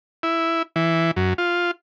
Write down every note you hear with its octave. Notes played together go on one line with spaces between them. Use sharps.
E4
E3
F#2
F4